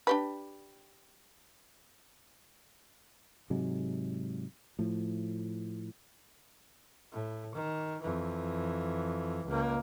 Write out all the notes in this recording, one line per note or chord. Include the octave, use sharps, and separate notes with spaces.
D4 G4 B4
G#2 C3 F#3 G#3
A2 F3
A2
D#3
F2 E3
C#2 A#3